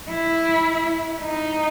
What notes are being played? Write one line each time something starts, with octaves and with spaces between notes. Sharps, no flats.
E4
D#4